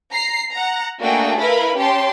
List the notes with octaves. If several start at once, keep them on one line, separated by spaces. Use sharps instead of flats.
A#5 C7
F#5 A#5
A3 A#3 D4 F#4 G#4 G5
E4 A#4 B4 F5 B5
C#4 G4 G5 A5 C6